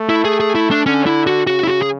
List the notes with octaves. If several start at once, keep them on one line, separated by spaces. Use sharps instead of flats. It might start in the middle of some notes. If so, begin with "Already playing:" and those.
Already playing: A3
E4
G#4
G#4
E4
D4
D3 C#4
E4
F#4
C#3 F#4
E4
F#4
G#4